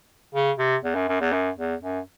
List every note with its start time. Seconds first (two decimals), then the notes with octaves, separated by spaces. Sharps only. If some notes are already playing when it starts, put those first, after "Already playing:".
0.34 C#3
0.59 C3
0.84 E2
0.96 F#2
1.08 F#2
1.21 E2
1.33 F#2
1.58 E2
1.82 F#2